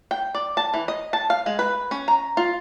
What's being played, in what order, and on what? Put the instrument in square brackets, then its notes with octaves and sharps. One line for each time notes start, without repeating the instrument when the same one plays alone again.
[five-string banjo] G5
D5
A5
E3
D#5
A5
F5
G#3
B4
C#4
A#5
F4